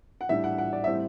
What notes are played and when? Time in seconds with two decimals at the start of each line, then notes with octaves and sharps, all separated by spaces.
0.21 F#5
0.29 A2 G3 D4 E5
0.44 F#5
0.58 F#5
0.73 D5
0.84 A2 G3 C4 E5